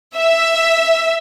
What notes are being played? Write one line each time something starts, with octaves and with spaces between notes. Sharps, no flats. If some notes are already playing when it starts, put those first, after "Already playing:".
E5